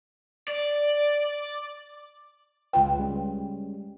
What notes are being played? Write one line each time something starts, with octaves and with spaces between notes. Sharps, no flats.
D5
C#2 F4 B4 G5
G3 G#3 C#4